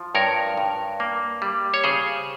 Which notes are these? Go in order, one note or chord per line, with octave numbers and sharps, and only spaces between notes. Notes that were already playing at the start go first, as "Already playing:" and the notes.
Already playing: F3
G2 A#4 C#5
G2
A#3
G3
C#5
C#3 G#4 C5